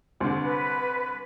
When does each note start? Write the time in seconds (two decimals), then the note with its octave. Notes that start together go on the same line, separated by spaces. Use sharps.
0.20 C2 D3
0.42 B4